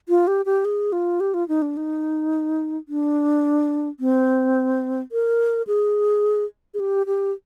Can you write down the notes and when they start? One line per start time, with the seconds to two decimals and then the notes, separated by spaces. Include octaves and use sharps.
0.09 F4
0.27 G4
0.46 G4
0.65 G#4
0.92 F4
1.20 G4
1.34 F4
1.48 D#4
1.62 D4
1.77 D#4
2.89 D4
4.00 C4
5.12 A#4
5.67 G#4
6.74 G#4
6.80 G4
7.07 G4